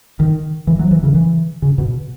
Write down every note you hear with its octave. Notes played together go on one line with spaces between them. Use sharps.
D#3
E3
F#3
E3
C#3
E3
C#3
B2